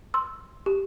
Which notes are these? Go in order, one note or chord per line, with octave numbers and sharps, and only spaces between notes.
C6 E6
G4